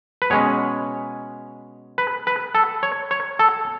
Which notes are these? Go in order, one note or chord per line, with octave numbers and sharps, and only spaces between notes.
B4
B2 G#3 C#4 C#5
B4
B4
A4
C#5
C#5
A4